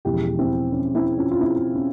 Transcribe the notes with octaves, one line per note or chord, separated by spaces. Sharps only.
E1 E2 C#3 F3 G#3 E4 G4
C4 E4
C#4
C4 E4
C#4 F4
F4
C4 E4
C#4